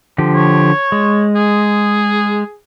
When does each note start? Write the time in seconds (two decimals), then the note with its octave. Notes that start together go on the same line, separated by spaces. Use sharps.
0.18 D3 F3 G4
0.34 C#5
0.92 G#3
1.35 G#4